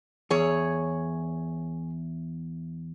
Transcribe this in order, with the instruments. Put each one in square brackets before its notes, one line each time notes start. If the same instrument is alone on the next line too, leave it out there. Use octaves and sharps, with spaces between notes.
[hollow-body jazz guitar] E2 [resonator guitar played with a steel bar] G#4 C#5